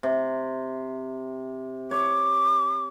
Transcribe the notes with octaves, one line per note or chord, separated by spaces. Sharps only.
C3
C#5 D6